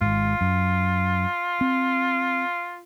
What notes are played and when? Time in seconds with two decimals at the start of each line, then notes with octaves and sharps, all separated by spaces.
0.01 G#1 G#2 F4
0.41 F#2
1.61 C4